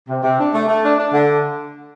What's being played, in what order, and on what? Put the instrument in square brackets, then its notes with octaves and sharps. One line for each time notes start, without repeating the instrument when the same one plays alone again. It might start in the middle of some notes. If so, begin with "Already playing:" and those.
[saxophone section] C3
C3
D4
A3
A3
D4
D4
D3